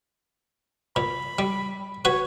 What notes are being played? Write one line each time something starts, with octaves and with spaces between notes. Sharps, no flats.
A#2 B5
G3
F#4 B4 C#5